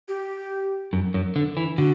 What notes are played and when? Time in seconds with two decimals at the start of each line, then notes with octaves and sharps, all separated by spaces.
0.08 G4
0.93 F#2
1.14 F#2
1.36 D3
1.57 E3
1.78 D3 F#4